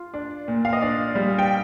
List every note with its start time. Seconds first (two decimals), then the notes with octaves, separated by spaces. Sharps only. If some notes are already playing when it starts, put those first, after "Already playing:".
Already playing: F4
0.14 D4
0.48 A#2
0.65 F5
0.73 D#5
0.82 D4 D5
1.15 G3
1.39 G5